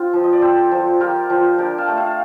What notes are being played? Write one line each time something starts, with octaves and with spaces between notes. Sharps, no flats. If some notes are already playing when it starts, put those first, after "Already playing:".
Already playing: C4 F4
F3
D#5
D5
C4 A4 C5
F3
F4 G4 A#4
F3
D4 G4 A#4
F5 A5
A3
F5 A5